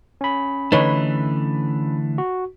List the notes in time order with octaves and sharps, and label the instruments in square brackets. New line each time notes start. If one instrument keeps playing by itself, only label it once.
[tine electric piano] C#4 B5
[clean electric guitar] D3 E3 A3 [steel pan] D#4 B4 C#5
[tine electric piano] F#4